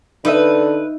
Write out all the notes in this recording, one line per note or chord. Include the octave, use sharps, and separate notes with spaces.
D3 D#4 B4 D#5 E5